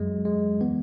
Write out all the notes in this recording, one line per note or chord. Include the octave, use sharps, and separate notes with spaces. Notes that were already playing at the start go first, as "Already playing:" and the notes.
Already playing: F#2 F#3 G#3
G#3
E3 B3